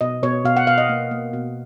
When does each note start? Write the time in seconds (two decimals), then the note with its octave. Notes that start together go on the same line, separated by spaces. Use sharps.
0.01 B2 D#5
0.23 B2 C#5
0.45 B2 F5
0.57 F#5
0.67 B2 F5
0.78 D#5
0.89 A#3
1.11 A#3
1.33 B2